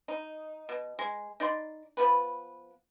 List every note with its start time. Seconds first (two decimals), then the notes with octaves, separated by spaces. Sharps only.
0.08 D#4
0.69 B2
0.99 G#3
1.40 D#4 D5 C6
1.97 F3 B3 B4